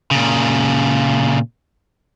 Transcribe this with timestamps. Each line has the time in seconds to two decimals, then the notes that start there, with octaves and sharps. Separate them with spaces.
0.11 A#2 C#3